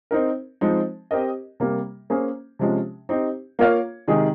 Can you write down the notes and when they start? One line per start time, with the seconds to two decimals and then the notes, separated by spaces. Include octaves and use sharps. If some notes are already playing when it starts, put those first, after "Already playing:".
0.11 C4 D#4 A#4
0.61 F3 G#3 C4 D#4
1.11 C4 G4 A#4 D#5
1.60 C3 G3 A#3
2.10 A#3 C#4 G#4 C5
2.59 C3 F3 G#3 C#4
3.09 C4 D#4 G4
3.59 A#3 F4 A#4 C#5 F5
4.08 C3 D#3 G#3 D#4 G#4